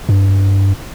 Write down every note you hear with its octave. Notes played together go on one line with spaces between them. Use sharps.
G2